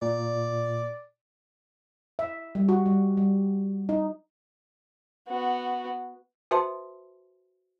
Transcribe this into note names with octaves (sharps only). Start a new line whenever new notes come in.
A#2 D5
E5
G3
F#4
G3
G3
D#4
B3 F#4
F#4 B4 C5 E5 A5 C6